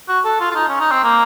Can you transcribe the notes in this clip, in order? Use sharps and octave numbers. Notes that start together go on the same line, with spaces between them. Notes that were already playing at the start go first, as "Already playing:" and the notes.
F#4
A4
F4
F4
D#4
C#4
D#4
C4
A#3